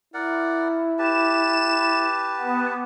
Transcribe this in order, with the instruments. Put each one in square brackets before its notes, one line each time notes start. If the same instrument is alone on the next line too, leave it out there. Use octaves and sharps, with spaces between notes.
[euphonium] E4 [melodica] A#4 D5 F#5
[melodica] G4 B4 A5 [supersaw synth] E7
[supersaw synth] B3